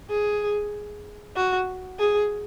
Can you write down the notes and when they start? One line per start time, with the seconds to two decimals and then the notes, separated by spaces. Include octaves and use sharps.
0.10 G#4
1.36 F#4
1.99 G#4